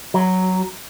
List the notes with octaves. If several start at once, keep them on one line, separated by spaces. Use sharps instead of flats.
F#3